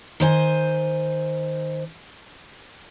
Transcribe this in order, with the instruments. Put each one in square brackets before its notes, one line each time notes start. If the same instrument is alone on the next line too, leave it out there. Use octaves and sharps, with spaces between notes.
[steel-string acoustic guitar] D#3 C5 G#5